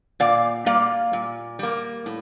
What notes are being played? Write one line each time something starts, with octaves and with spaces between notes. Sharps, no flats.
A#2 D5 F5
G3 A#3 D5 F5
A#2
G3 A#3
A2